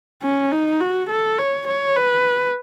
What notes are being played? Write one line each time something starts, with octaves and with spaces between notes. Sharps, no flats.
C#4
D#4
F#4
A4
C#5
C#5
B4